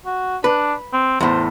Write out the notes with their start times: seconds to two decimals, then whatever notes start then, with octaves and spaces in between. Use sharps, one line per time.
0.06 F#4
0.44 D4 B4
0.93 C4
1.21 E2 A2 C5